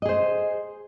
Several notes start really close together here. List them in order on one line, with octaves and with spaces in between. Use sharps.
D#5 G#4 C5